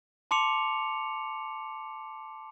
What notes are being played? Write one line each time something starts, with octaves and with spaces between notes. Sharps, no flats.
A5 C6 D6 C#7 F7